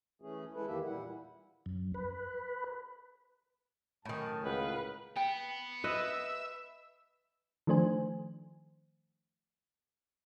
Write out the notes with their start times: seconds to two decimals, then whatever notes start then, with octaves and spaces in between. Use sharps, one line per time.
0.22 E3 A3 C#4 G#4
0.54 G#3 E4 A4 B4
0.67 E2 D#3 E3 A#3 G4 E5
0.85 A#2 G3 E4 F#5
1.66 F#2
1.94 B4
4.05 F#2 A2 D#3 G#5 A5
4.44 C#2 A#4 B4 F5 F#5
5.16 B3 G5
5.84 B4 D#5 E5
7.67 D#3 F3 A3 D4 C5 G#5